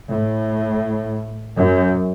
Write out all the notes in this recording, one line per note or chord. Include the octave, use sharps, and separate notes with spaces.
A2
F#2